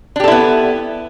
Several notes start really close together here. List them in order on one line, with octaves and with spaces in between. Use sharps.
D4 G4 A4 E4 B3